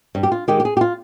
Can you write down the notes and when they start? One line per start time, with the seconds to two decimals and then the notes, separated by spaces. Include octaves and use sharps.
0.15 G2
0.23 G4
0.32 F4
0.48 D#3 G#3 G4
0.60 G4
0.65 G#4
0.77 G4
0.81 F4